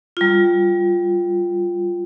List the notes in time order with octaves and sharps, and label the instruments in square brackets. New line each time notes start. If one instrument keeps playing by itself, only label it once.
[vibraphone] G3 F4